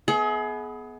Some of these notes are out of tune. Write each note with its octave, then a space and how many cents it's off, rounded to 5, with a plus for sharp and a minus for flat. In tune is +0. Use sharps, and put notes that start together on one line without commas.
B3 +0 G#4 +30 E5 -45